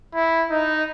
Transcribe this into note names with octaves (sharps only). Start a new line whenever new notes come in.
E4
D#4